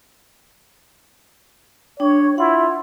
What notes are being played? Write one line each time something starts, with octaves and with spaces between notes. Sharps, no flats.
D4 C#5 G5
E4 F4 F#5